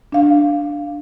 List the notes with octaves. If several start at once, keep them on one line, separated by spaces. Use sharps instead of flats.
D4 F5